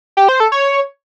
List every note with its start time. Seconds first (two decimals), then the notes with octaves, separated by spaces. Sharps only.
0.17 G4
0.29 C5
0.40 A4
0.52 C#5